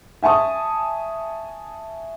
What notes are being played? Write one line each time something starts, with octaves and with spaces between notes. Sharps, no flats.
E5 G#5 A5 C#6 D#6